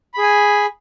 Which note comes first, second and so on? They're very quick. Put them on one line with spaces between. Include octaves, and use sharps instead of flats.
B5 G#4 G#5